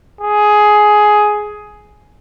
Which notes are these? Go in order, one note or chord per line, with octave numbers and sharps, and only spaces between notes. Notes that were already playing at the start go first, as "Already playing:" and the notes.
G#4